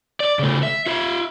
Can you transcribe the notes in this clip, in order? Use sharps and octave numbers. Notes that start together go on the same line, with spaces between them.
D5
C#3 A3
E5
F4 E5